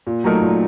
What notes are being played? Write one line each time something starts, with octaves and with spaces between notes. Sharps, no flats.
A#2
F#3 A3 D#4 A#4
A#2